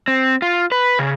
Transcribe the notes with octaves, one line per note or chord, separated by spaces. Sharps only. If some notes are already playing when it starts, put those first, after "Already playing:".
C4
F4
B4
C#3